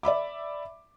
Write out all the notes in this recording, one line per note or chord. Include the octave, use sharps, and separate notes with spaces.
D5 E5 B5 D6